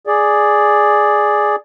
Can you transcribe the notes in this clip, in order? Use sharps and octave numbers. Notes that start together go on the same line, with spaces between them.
G#4 D5